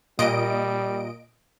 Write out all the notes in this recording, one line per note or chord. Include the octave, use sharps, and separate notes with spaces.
A#2 G3 D#5 D7